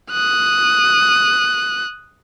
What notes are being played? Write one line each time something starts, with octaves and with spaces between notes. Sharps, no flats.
D#6 F#6